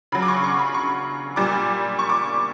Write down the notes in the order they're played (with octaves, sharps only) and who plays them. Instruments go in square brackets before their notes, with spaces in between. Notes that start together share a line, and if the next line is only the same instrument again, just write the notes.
[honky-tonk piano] C#3 F#3 B5
D6
C#6
C#6
B5
C#6
A#2 G3 D6
C#6
D6